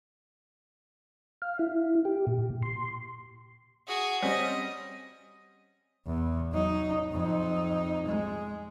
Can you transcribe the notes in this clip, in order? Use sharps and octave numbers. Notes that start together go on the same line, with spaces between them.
F5
E4
G4
A#2
C6
F#4 G#4
G3 C4 C#4 D#5
E2
F#3 D#4
F2 D#4
G#3